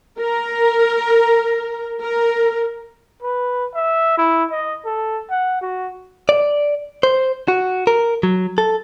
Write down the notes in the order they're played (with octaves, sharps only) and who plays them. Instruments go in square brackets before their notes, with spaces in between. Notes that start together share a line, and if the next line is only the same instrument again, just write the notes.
[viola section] A#4
A#4
[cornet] B4
E5
E4
D#5
A4
F#5
F#4
[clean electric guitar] D5
C5
F#4
A#4
F#3
A4